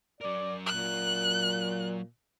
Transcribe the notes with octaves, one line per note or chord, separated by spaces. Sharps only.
F#3 A#4 D5
A#2 F#6